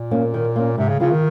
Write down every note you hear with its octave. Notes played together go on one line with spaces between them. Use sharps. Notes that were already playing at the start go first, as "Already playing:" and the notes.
Already playing: A#2
A#3 C#4
D#3
A#3 C#4
G#2 C3
C#3
C#3 F3 C4 F4
D#3